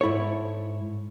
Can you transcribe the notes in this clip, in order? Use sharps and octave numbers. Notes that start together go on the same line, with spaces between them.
G#2 E4 A4 C#5